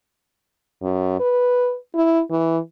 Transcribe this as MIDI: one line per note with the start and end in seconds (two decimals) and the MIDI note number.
0.83 1.16 42
1.20 1.76 71
1.95 2.21 64
2.31 2.58 52